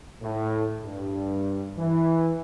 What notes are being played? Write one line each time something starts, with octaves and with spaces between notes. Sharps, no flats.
A2
G2
E3